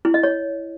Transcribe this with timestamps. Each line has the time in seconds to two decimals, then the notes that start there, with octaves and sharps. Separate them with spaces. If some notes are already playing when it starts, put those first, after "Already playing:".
0.05 E4
0.14 D#5
0.23 C#5